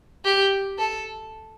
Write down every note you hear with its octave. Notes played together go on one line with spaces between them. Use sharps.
G4
A4